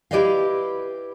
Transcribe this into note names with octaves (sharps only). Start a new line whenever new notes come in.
E4 G4 B4 D5 D#5 F5